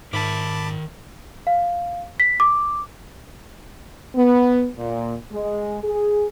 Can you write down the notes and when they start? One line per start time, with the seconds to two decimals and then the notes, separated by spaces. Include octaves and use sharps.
0.13 G#2 D#3 A#4 E5 A5 B5 D6
1.47 F5
2.20 B6
2.40 D6
4.14 B3
4.77 A#2
5.31 G#3
5.83 G#4